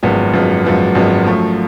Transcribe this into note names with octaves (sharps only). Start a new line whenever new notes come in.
G#1 F#2 F3 G#3 B3
G#1 F#2 F3 G#3 B3
G#1 F#2 F3 G#3 B3
G#1 F#2 F3 G#3 B3
F#2 F3 A3